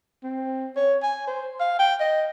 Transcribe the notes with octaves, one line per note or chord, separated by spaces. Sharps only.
C4
C#5
G#5
C5
F5
G5
D#5